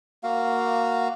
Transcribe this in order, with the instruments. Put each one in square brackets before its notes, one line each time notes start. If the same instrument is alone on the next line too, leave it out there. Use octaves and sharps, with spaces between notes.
[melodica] A#3 F#4 F5